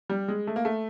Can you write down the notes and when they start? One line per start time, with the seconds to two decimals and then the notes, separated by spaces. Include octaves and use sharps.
0.10 G3
0.28 G#3
0.47 A3
0.56 A#3
0.65 A3